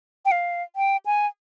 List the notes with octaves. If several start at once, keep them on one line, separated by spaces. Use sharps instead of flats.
G5
F5
G5
G#5